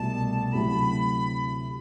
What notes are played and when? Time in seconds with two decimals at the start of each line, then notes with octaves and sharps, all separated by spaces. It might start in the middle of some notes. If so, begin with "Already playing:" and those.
Already playing: C2 B2 A3 A5
0.53 D2 C3 F#3 A3 E4 B5